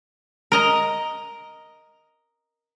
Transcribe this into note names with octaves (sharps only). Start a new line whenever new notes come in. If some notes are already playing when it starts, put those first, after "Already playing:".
A#4 D#5 A#5